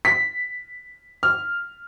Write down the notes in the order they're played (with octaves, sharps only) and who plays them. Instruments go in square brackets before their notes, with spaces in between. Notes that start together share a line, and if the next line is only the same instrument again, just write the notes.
[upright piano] B6
F6